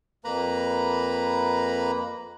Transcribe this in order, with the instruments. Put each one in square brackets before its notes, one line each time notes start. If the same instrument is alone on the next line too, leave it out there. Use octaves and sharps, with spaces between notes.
[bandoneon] F2 A#3 B4 A#5 B5